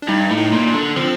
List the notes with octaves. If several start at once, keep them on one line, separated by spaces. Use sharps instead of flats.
D4
G2 D#4
A2
D#4
A#2
D4
D3
F3 C4